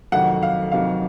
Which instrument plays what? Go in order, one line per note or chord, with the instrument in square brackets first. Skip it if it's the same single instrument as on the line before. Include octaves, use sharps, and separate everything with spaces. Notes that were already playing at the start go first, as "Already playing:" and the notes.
[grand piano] F2 C3 D#3 F#3 A3 [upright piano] F#5
[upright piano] F5
[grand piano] F2 C3 D#3 F#3 [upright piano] F5